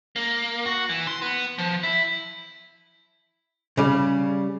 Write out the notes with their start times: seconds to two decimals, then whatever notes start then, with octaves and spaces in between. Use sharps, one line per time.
0.16 A#3
0.66 F#4
0.89 E3
1.07 C6
1.22 B3
1.58 F3
1.83 E4
3.77 C#3 G3